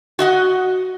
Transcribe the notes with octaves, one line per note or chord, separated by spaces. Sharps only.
F#4 D#5 F#5